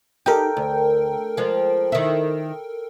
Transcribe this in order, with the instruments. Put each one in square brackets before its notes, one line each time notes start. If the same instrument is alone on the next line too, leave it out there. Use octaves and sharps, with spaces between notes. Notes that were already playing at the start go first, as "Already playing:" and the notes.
[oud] D#4 G4 [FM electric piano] A4 A#4 G5
[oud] D2
F3 G#3
D#3 E4